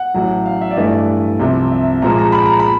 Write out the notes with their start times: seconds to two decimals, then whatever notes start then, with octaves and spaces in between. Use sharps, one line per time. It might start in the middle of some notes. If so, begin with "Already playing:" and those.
Already playing: F#5
0.14 A1 A2 F#3
0.46 F5
0.61 E5
0.71 D5
0.77 G2 E3 A3 D#5
0.88 D5
1.40 C2 C3 F3
1.71 E5
2.02 A#2 F3 G#3 A#5
2.18 A#5
2.32 B5
2.46 A#5
2.60 B5